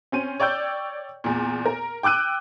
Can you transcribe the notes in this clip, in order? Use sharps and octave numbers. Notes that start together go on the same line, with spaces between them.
C4 C#4 D#7
C#5 D5 G5 E6 G6
E2 A#2
A#4
G5 D6 E6 F#6 D#7